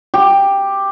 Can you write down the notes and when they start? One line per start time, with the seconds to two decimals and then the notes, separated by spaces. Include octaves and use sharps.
0.14 G4